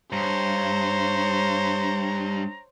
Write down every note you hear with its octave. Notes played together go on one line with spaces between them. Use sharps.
G2 C5 C#5 A#5